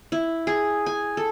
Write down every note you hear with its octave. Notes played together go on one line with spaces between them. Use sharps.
E4
G#4
G#5
A4